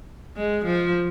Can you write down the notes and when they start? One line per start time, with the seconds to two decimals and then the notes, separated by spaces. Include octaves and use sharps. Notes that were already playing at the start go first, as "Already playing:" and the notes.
0.36 G#3
0.65 F3